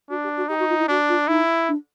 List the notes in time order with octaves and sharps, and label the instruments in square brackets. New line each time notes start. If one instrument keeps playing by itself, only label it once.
[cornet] D4 [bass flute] F#4
[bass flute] G4
F#4
[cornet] D#4 [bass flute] G4
[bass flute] F#4
F4
E4
[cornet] D4 [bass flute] F#4
[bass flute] F4
[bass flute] D#4 [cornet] E4
[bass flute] D4